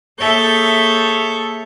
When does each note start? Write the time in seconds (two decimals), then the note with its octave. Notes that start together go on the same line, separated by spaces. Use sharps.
0.20 A#3 G#4 A4 C#5 E5 G6